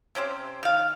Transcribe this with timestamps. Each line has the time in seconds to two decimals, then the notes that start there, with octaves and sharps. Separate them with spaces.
0.15 C3 C#4 G4 C5
0.63 D#3 F5